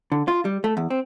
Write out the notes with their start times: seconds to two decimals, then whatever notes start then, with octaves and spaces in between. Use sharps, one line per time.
0.12 D3
0.28 F4
0.45 G3
0.64 A3
0.77 E2
0.90 C4